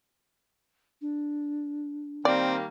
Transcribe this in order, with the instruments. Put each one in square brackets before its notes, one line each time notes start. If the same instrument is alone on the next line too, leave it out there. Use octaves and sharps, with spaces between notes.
[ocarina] D4
[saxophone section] D#3 G3 A#3 [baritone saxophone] C4 [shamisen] D5